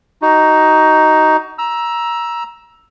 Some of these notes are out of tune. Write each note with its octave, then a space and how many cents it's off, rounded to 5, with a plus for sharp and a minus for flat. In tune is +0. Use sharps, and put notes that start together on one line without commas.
D#4 +5 F#4 +25
A#5 +20 E6 +0